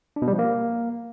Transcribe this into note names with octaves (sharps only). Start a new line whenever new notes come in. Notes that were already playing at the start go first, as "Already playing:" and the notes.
D4
B2
G3
F3
A#3